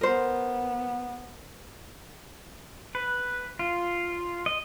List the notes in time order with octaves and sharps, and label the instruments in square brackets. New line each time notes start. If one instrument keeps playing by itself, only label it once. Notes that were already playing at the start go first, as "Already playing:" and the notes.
[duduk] B3 [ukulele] A#4 C5
[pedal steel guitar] B4
F4
D#5